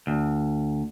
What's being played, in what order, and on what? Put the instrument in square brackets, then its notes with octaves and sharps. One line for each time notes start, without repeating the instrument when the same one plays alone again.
[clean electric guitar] D2